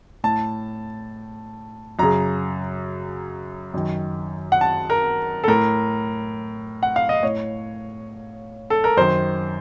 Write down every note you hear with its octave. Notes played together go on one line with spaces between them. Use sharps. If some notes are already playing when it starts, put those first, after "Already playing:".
A2 A5
F#2 C#3 A#5
F#2 D#3
F#5
A5
A#4
A4
A2 A#4
F#5
F5
D#5
A2 C#5
A4
A#4
F#2 D#3 C5